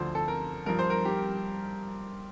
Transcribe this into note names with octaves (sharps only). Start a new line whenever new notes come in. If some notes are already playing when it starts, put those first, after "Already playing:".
Already playing: D2 D3 F3 C5
A4
A#4
G2 F3 A#4
C5
A#4
G4